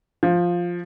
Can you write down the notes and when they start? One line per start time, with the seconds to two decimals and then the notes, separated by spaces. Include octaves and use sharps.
0.23 F3